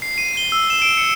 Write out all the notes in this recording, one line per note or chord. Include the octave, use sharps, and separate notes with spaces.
C7
D#7
G7
E6
E7
D7
C#7